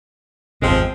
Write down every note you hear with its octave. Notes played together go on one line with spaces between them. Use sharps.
G#1 E2 C3 F3 G#3 C4